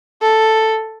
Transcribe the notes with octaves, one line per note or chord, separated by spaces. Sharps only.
A4